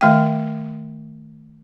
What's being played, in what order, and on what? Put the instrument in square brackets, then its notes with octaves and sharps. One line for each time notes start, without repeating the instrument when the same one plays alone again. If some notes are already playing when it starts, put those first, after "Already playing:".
[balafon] D#3 A3 F5 G5